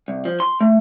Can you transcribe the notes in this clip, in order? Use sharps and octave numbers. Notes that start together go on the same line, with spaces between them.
C2
F3
C6
A3